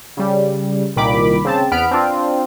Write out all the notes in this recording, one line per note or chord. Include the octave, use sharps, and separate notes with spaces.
C#3 G3
C2 A#2 D#3 B5 D6
C#3 C4 A5
E2 B3 B5 F6 D7
C4 D4 F4